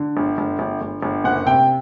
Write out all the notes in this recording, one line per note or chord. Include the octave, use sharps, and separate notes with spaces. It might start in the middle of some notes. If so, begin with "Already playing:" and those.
Already playing: D3
G1
G1
G1
G1
G1
F#1 F#5
C3 G5